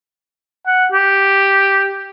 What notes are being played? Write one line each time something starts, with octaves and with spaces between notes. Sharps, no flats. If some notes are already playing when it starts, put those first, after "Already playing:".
F#5
G4